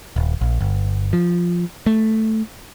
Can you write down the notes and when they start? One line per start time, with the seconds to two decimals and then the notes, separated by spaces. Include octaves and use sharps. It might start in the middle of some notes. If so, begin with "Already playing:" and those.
0.16 D#1
0.41 A#1
0.61 G1
1.13 F3
1.86 A3